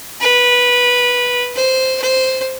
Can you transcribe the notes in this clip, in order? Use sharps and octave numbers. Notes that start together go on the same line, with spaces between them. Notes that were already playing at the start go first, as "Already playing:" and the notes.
B4
C5
C5